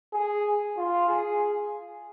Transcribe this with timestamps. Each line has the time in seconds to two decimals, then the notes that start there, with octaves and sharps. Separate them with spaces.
0.13 G#4
0.78 F4
1.09 G#4